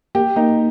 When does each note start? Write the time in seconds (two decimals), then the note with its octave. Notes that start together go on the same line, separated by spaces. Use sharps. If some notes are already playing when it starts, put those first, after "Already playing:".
0.15 A#3 G4
0.36 A#3 D#4